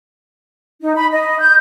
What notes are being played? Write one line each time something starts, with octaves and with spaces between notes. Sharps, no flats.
D#4
B5
D#5
G6